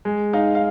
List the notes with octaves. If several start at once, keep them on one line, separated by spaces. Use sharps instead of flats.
G#3
D#4 F5
F5